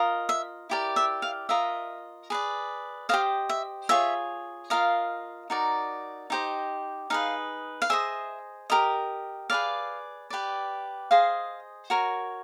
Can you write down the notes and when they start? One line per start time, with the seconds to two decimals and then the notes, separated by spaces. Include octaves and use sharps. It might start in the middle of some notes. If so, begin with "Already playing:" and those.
Already playing: F4 A#4 D#5
0.29 E5
0.70 E4 G4 A#4 D5
0.96 E5
1.22 F5
1.49 F4 A#4 D#5 E5
2.30 G#4 B4 D5
3.09 G4 C5 D#5 F5
3.49 E5
3.89 F4 G#4 C#5 E5
4.70 F4 A#4 D#5 F5
5.50 D#4 F#4 A#4 D5
6.30 D#4 G4 C5 D#5
7.10 D#4 G#4 B4 F5
7.82 F5
7.90 G#4 C5 D#5 E5
8.70 G4 A#4 D#5
9.50 G#4 B4 D5 F5
10.30 G4 B4 D5
11.11 G#4 C5 D#5 F5
11.90 F#4 A#4 C#5